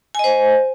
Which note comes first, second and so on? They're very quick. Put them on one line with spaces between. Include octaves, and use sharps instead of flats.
G#5 D#5 C5